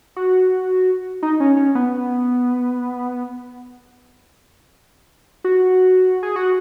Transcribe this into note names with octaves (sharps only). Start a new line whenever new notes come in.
F#4
D#4
C#4
C#4
B3
F#4
G#4
F#4